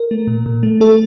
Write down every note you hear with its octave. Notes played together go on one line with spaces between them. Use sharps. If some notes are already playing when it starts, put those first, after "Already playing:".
Already playing: A#4
A3
A#2
A#2
A3
A3 A4